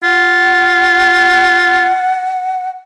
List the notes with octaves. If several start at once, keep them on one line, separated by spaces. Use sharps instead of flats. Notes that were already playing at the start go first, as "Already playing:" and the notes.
F4 F#5